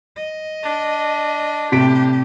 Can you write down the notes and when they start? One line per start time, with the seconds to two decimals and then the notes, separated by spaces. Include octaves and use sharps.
0.16 D#5
0.63 D4
1.72 A2 C3 G4 B6 D7